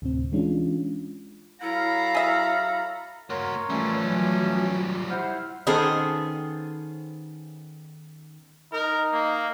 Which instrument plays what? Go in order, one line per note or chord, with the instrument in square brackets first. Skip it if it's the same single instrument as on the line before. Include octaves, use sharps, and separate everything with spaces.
[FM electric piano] D2 A2 C3 C4
E3 G#3 C#4 D4 F4
[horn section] F#3 A4 F5 [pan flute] E4 [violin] A#5 B5
[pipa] G#4 E5
[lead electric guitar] A#3 F#4 [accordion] A#4 C#5 C6
[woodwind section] E3 A3 C#4 [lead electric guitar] F3 G3
[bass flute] F#3 [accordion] C#5
[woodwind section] E4 C5 [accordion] F#5 F6
[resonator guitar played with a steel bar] D#3 B3 C#4 G#4 A4 C5
[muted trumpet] D#4 [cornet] A#4
[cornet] A#3